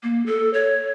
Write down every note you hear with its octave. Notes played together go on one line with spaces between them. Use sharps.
A#3
A4
C#5